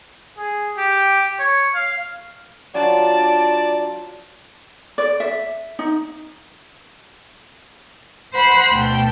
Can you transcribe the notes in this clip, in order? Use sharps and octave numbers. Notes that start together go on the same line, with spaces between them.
G#4
G4
C#5
F5
F#3 D4 F4 D5 A5
D5
E5
D#4
C5 F#5 B5 C6
D2 B2 G5 A5